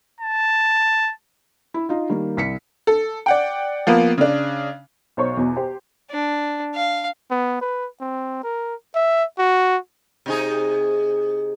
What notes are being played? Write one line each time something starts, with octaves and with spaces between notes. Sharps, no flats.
A5
E4
D#4 F4
D#3 G3 A#3
C2 B6 C#7
A4
D5 F#5 G5
F3 A#3 B3
C#3 D4
B1 C5 C#5 C#6
E2 B2
G4 C5
D4
F5
B3
B4
C4
A#4
E5
F#4
C3 D#4 G#4